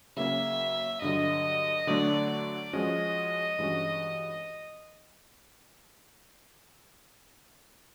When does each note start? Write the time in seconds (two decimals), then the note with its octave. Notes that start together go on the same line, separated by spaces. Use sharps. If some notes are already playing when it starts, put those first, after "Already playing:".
0.17 C#3 F#3 A#3 C#4 E5
1.02 G2 D3 F#3 D#5
1.87 D3 F#3 A3 D4 D5
2.30 D5
2.73 F3 G#3 C#4 F#4 D#5
3.59 G2 E3 G#3 C#4 F#4